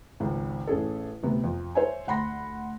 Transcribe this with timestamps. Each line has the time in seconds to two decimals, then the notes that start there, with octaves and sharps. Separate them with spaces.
0.20 G#1 C#2 G#2
0.67 A1 C#4 G#4 A4
1.23 D2 C3 B3
1.44 F2
1.75 C5 C#5 E5 G#5
2.07 D2 F#5 B5 C6 A#6